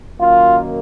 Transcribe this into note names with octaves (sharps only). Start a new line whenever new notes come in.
F#2 D#3 A#3 F4